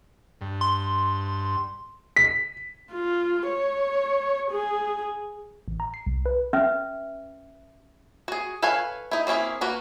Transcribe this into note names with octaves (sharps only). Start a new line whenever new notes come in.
G2
C6
B6
F4
C#5
G#4
A1
A#5
C7
C2
B4
C#4 B4 E5
F#4 G#4
A4 B4 C#5 F5 G#5
D#4 E4
A#3 C4 C#4 E4 G#4
A#3 F#4 B4